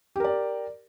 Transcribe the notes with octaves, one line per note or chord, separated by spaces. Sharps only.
G4 A#4 D5